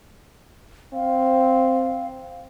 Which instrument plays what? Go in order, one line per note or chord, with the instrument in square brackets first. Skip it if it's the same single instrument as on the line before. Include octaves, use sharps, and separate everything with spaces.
[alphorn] C4 [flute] F5